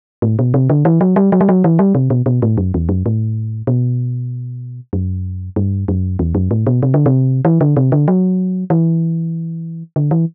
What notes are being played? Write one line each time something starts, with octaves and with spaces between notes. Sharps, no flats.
A2
B2
C3
D3
E3
F#3
G3
F#3
G3
F#3
E3
G3
C3
B2
B2
A2
F#2
E2
F#2
A2
B2
F#2
G2
F#2
E2
F#2
A2
B2
C3
D3
C3
E3
D3
C3
D3
F#3
E3
D3
E3